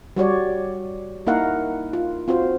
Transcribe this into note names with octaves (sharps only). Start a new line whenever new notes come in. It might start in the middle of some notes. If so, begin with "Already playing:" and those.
G3 F#4 C#5 D5
A#3 D#4 E4 A#4 F5 F#5
F4
C4 F4 F#4 C5